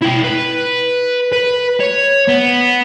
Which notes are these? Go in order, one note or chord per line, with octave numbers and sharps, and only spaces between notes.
E4 G5
B4
B4
C#5
B3